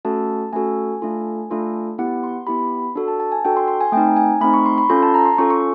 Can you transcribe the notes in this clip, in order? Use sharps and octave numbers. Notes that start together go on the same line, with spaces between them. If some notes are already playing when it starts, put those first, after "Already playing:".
A3 C#4 F#4 A4 A5
A3 C#4 F#4 A4 G#5
A3 D4 F4 A4
A3 D4 F4 A4
B3 E4 G4 F#5
C6
B3 E4 G4 B5
D4 F#4 A4
A5
A5
G#5
D4 F#4 A4 G5
C6
C6
G#5
A3 C4 D#4 G5
G#5
A3 C4 D#4 B5
C#6
C6
B5
C#4 F4 A4 C6
A5
A#5
C6
C#4 F4 A4 C#6
C#6